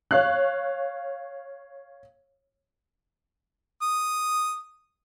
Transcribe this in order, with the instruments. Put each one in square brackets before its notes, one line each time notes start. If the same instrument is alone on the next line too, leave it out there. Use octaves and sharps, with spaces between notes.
[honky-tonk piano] C#5 F5 F#6
[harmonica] D#6